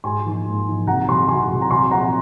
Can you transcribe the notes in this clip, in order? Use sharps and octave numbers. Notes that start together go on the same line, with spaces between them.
G#2 G#5 C6
F3 A#3 D#4
G#2
F3 A#3 D#4
C2 F#5 A#5
C3 F#3 G#5 C6
C2 G#5 C6
C3 F#3
A#5
C2 G#5 C6
A#2 F3 C4 F#5 A#5